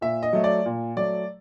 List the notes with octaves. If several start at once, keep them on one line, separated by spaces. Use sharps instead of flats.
A#2 E5
D#5
F#3 A3
D5
A#2
F#3 A3 D5